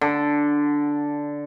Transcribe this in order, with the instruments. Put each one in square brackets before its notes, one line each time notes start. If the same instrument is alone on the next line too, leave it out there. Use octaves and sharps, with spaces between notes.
[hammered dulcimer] D3